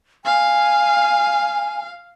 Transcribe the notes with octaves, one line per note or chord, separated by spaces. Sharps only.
F5 G#5